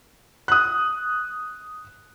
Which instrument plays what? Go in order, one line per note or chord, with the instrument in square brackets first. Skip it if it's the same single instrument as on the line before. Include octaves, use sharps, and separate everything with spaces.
[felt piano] D#6 F#6